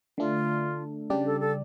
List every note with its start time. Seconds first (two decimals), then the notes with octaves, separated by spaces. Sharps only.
0.18 D3 A3 D4 F4 A4
1.10 C#3 G3 D4 G4 D5
1.26 A4
1.40 A4